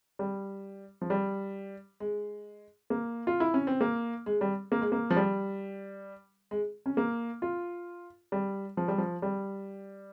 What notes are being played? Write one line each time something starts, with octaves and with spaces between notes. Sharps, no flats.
G3
F3
G3
G#3
A#3
F4
E4
C#4
C4
A#3
G#3
G3
A#3
G#3
A#3
F3
G3
G#3
C#4
A#3
F4
G3
F3
G3
F3
G3